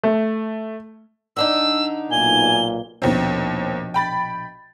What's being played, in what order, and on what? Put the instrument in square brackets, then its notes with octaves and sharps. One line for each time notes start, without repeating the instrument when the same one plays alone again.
[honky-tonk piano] A3
[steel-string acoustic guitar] D3 D4 D#4 [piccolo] E6
[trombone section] B1 A#2 [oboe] G#5 [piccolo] G7
[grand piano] A#1 B2 [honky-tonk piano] D#2 C4
[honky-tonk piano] G5 B5 A6